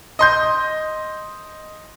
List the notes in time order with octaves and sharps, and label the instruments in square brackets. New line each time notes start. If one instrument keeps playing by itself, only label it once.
[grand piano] D#5 C6 G6